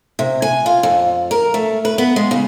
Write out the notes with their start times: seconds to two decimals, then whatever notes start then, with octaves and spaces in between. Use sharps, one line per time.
0.19 C3
0.42 G#5
0.66 F4
0.83 F2
1.31 A#4
1.54 A3
1.85 B4
1.98 B3
2.16 G#3
2.31 C#3